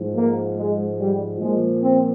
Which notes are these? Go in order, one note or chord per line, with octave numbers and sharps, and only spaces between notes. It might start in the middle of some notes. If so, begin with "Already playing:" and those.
Already playing: G#2 F3
A#3
G#3
G3
A#2 F3 G#3
C4